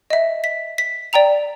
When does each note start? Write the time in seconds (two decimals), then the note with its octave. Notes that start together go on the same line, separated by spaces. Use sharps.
0.10 D#5 E5
0.44 B6
0.78 B6
1.13 D5 G5 A#5 F7